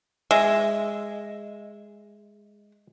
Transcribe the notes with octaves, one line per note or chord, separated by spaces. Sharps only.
G#3 E5